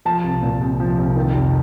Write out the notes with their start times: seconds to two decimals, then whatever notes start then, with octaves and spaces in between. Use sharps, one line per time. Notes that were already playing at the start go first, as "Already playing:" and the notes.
0.05 F3 A5
0.24 C2
0.43 A#2
0.61 C2
0.80 F3
0.98 C2
1.16 D#3
1.34 F1